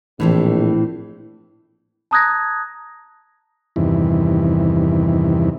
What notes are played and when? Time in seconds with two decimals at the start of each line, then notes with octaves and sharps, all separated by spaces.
0.20 A#1 A2 E3 C4
2.11 A5 A#5 D#6 F#6 G#6 A#6
3.76 E2 G2 C3 D#3 E3